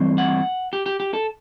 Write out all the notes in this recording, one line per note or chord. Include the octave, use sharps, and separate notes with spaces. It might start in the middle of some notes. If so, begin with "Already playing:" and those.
Already playing: G2 E3 A3 C4
F#5
G4
G4
G4
A4